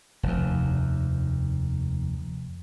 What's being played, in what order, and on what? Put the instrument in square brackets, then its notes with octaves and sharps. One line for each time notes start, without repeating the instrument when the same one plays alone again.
[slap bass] F1 D#2